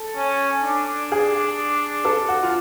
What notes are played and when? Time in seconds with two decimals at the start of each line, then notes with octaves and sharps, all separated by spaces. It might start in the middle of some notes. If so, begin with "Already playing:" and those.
Already playing: A4
0.17 C#4
0.64 D4
1.12 G#4
2.05 A4
2.28 F#4
2.43 F4